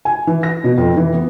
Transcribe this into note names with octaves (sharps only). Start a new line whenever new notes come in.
G#5
E3
A#6
B2
F2
E3
B3